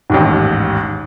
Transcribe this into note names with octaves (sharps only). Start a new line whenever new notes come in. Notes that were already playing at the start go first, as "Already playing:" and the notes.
A1 D#2 G#2